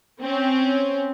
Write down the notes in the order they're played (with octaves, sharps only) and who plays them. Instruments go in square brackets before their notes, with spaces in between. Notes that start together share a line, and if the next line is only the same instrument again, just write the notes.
[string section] C4 C#4